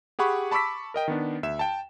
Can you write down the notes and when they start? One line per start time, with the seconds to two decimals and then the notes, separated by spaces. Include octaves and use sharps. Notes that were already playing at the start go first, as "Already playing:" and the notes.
0.19 G4 G#4 F#5 B5 C#6
0.51 A5 B5 C#6 D6 E6 B6
0.94 A#4 D#5 G5
1.08 D#3 B3 D4
1.43 D2 E5 E7
1.59 G5 A5